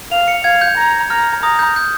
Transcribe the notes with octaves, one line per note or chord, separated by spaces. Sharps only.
F5 F7
C#7
F5 G#6
G6
A#5
A#5 F6
A#5 D#6
G6
G6